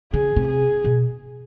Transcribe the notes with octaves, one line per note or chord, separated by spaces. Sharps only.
C#3 G#4
C3
G#4
B2